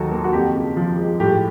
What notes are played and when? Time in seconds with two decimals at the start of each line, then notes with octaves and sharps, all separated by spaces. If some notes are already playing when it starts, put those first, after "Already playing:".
Already playing: D#2 D#3 F#3 F#4 A4
0.11 A#3
0.24 F#4
0.33 F2 G4
0.55 C#3
0.76 F3
0.98 G#3
1.20 A2 G4